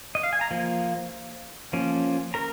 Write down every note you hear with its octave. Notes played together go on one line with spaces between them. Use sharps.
D#5
F5
G#5
A#5
F3 A#3
F3 A#3 C#4
A#4 A#5